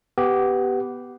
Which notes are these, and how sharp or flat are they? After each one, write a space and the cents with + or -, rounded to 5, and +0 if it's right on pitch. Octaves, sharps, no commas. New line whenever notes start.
B3 +5 G4 -10